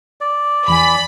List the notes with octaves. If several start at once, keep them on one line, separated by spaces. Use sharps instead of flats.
D5
E2 E3 G#5 B5